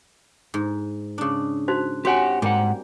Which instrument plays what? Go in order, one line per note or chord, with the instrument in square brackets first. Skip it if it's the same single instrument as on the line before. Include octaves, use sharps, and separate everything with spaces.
[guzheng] G#2
C#3 D4
[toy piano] D#4 F#4 C5
[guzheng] C4 [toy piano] F#4 C#5 G#5 [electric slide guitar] G4 F#5
[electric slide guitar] G#2 F#5 [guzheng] G3 A#3